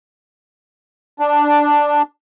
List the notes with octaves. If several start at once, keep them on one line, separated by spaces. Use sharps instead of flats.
D4